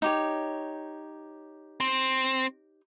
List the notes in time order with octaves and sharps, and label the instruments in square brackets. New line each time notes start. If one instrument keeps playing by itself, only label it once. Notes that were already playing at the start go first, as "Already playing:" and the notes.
[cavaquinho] D#4 G4 C#5
[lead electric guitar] C4